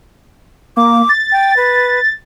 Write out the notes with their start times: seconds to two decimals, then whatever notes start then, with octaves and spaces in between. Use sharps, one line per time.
0.77 A#3 D6
1.09 A6
1.32 G5
1.57 B4